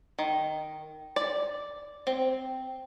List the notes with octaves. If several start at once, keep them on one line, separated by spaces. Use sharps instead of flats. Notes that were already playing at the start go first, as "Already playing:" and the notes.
D#3
D5
C4